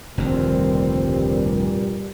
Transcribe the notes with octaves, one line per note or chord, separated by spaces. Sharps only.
F1 D2 G2 A#2 D#3 G3 C4